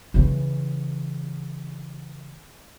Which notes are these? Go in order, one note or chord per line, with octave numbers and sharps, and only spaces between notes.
C#3 E3